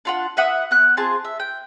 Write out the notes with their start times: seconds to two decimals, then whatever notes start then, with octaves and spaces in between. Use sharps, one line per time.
0.05 D4 F4 F#5
0.37 B4 E5 F#5 D#6
0.71 B3 F#6
0.97 C4 F4 G#4 A5
1.24 E5
1.40 G5